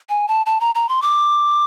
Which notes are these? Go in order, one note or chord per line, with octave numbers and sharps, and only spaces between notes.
G#5
A5
A5
A#5
A#5
C6
D6